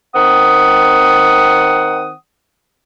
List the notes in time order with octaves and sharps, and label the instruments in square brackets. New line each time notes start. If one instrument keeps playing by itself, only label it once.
[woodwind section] D#3 C4 F#5 D#6